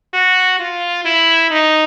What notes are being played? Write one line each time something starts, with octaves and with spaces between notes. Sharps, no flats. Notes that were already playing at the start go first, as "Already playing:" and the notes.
F#4
F4
E4
D#4